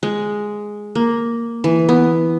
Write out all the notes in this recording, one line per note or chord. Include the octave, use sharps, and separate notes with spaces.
G#3
A#3
E3
B3